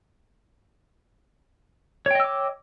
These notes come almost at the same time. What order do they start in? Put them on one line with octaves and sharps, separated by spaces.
C#5 G5 D#5 E6 D6